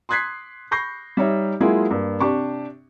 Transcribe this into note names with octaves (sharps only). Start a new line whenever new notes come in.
C6 D#6 F#6 G#6 B6 C7
B5 C#6 G6 A#6 C7
G3 D#4 C#5 E5
F#3 G#3 A#3 E4 F4 G#4
G2 A#3
C3 D4 G4 C#6